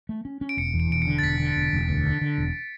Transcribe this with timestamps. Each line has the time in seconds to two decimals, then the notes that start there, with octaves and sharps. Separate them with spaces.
0.09 A3
0.25 C#4
0.41 C#4
0.49 D7
0.57 E1 C#7
0.74 E2
0.80 D7
0.90 E1 D7
1.02 C#7
1.07 D3
1.19 A6
1.23 E1 B6
1.40 D3
1.56 E1
1.73 E1
1.89 D2
2.06 D3
2.21 D3
2.38 E1